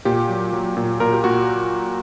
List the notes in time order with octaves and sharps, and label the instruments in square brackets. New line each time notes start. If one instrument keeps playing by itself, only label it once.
[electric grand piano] A#2 G4
F#3
F#3
A#2
A#2 A#4
G4
A#2 F#4